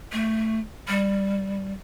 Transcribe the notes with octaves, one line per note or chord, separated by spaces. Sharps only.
A3
G3